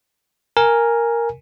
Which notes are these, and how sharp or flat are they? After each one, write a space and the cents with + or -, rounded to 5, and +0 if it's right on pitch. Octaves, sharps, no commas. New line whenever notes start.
A#4 +0 G#5 -5